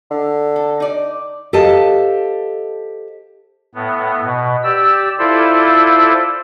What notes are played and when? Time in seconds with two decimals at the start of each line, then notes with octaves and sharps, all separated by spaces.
0.11 D3
0.56 A4
0.80 D#4 D5
1.53 G4 A4 C5 D#5 F5 A5
3.75 A2 B3
4.24 B2
4.63 G4 D5 E6
5.19 E4 F4 A4 C5 D5